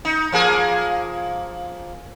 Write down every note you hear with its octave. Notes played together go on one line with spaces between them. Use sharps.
D#4
F3 A#3 G#4